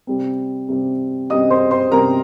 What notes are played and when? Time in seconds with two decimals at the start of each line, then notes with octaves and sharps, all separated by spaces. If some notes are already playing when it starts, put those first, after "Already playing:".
0.07 C3 G3 C4
0.69 C3 G3 C4
1.30 C3 G3 C4 D#5 D#6
1.50 C5 C6
1.71 C5 C6
1.91 C3 G3 C4 A#4 A#5